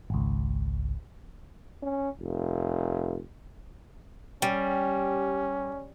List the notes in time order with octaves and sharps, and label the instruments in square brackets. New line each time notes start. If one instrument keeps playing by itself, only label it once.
[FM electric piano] G#1 C#2
[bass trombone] C#4
F1
[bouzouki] G3 [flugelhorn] C#4